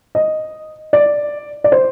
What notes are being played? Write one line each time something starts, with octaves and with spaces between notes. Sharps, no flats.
D#5
D5
D5
C5